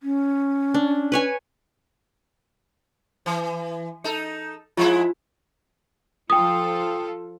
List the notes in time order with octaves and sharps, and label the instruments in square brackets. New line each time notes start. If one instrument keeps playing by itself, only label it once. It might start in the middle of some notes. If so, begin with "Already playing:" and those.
[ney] C#4
[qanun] D4
B4 C#5 G#5
[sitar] E3
D#4 A4
[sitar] F3 G#3 E4 [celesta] F4
[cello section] F3 F4 A4 [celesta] G5 D#6